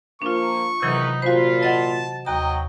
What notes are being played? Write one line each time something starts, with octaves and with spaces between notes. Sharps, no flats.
F3 A#3 D4 F4 C#6
E2 C3 D#3 E3 F#3 D#4 B4
A#2 F4 F#4 C5 B5
D#5 F#5 A5
D#2 F#3 D#5 G5 A#5